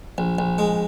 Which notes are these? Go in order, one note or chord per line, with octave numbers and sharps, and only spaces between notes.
A#1
A#1
G#3